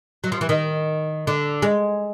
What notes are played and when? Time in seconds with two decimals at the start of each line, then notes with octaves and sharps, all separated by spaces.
0.24 F#3
0.32 F3
0.41 E3
0.49 D#3
1.27 D3
1.62 G#3